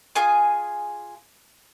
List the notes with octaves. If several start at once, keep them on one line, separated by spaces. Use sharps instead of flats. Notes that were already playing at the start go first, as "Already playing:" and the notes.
F4 G#4 G#5 D#6